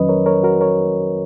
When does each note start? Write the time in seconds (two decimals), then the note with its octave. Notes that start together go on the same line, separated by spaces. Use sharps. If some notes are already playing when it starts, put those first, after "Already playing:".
Already playing: F2 D#3 F#3 C#4 B4 D#5
0.09 A#4 C#5
0.26 A#4 C#5
0.43 F#4 A#4
0.61 A#4 C#5